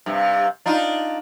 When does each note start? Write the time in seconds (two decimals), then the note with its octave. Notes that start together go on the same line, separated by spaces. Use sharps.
0.06 G2 C3
0.66 D4 D#4 F4